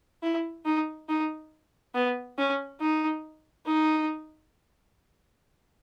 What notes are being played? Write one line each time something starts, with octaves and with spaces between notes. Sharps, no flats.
E4
D#4
D#4
B3
C#4
D#4
D#4